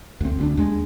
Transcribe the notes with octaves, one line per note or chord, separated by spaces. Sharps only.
D2 C4
D2 B3 D4
D#2 G#3 D4